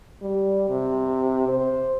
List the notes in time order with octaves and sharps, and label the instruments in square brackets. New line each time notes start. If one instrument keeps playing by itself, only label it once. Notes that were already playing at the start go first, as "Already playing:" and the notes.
[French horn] G3
C3
C5